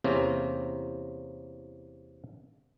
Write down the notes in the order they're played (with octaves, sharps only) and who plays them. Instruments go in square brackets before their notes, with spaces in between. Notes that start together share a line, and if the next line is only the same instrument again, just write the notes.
[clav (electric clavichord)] E2 C3 A#3 C4 C#4